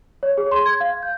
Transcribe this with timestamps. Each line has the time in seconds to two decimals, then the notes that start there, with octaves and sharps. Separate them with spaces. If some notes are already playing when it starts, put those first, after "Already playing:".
0.23 C#5
0.38 G#4
0.52 C6
0.66 G#6
0.80 F5
1.03 G6